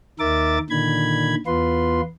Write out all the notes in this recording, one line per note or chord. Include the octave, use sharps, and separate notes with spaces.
D#2 D#3 A#4 E5 D6 A6
A#2 D3 D#3 B5 G#6
E2 B3 F4 B4 C6